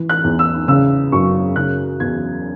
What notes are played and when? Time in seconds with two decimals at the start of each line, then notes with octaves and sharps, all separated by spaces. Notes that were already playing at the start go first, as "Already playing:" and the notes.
Already playing: E3
0.09 F#6
0.24 E2
0.39 E6
0.68 C#3 E6
1.12 F#2 C#6
1.56 C#3 F#6
2.00 E2 G#6